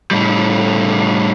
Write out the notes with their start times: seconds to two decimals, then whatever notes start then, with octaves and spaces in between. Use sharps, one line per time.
0.11 A2 G3